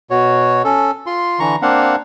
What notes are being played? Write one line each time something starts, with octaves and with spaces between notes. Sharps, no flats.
B2 F#4 C#5
C#4 A4
F4 C6
D3 E3 A#5 C#6
A#3 C4 D4 F5 F#5